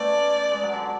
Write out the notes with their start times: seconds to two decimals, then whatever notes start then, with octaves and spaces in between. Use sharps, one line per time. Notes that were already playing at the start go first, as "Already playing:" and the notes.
Already playing: A3 B3 C#4 D5
0.51 G#3
0.63 F#3
0.73 D3